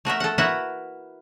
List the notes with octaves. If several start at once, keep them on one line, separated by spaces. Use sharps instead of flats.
A3 F#4 A#4 E5
A4 F#5
E4 F#4 A#4 B4 E5 F#5